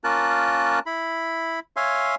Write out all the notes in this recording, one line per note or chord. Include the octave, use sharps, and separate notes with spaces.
A#3 C#4 F4 A#4 A5 F#6
E4 B5
C#5 E5 F5 G#5 C6